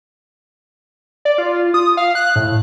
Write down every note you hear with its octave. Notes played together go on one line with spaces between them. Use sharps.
D5
F4
D#6
F5
F#6
A2